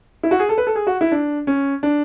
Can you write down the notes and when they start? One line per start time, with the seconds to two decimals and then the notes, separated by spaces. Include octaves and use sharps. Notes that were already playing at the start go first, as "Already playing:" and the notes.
0.23 E4
0.31 F#4
0.39 G#4
0.49 A4
0.58 B4
0.67 A4
0.76 G#4
0.87 F#4
1.01 E4
1.12 D4
1.47 C#4
1.83 D4